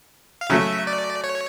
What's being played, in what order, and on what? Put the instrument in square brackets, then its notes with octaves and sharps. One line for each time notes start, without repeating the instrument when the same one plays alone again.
[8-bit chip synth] F5
[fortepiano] C#3 F#3 A3 [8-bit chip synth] E5
[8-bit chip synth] D5
C#5